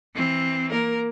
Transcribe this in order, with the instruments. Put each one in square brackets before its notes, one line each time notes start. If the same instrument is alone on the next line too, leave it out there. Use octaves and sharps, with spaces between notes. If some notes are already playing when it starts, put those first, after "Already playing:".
[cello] E3 C4
[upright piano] A#3 [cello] A#4